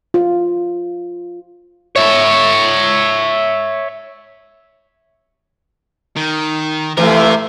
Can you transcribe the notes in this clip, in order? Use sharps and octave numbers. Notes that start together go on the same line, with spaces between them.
F4
C#5 E5
D#3
C3 E3 F3 A3 F4 A#4